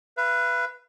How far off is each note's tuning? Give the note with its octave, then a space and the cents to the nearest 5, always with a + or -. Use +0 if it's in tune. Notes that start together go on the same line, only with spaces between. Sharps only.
B4 +0 F5 -45